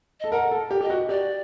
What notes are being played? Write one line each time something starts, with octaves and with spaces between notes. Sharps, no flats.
A4 D#5
A#4 F#5
A4
G4
G4 D#5
F#4
G4 D5